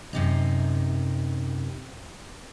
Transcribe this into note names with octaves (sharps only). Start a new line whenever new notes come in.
F#2 C3 D#4